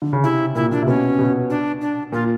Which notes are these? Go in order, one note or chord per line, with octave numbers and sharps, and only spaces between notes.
D3
C#3
C3 E4
A#2 E4
A#2 D4
C3
B2 C#4
B2
D4
D4
A#2 F4